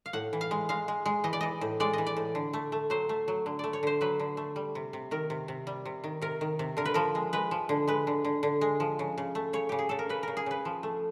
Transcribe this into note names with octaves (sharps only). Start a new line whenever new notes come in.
F5
A2 F#5
E3
F5
G#3
G#3 F5
G#3
G#3
E3 D#5
D5
E3 D#5
A2
G#3 D5
E3 D#5
D5
A2
D3
A3
A3
F#3 C5
A3
F#3
D3
A3 D5
C#5
D3 C5
F#3 B4
D3
A3
G3
C3
C3
D#3 A#4
C3
C3
G3
C3
D#3
C3 A#4
D#3
C3
D3 A#4
B4
F3 A#4
G#3
G#3 B4
F3
D3
G#3 B4
D3
D3
D3
G#3
F3
C#3
C#3
A3
C#3 C#5
C#3 G4
G#4
C#3 A4
A#4
C#3 B4
C#3 A#4
G#4
C#3 B4
F3
A3